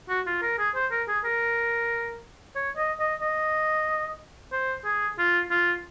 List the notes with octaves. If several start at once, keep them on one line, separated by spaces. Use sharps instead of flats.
F#4
F4
A#4
G#4
C5
A#4
G#4
A#4
C#5
D#5
D#5
D#5
C5
G#4
F4
F4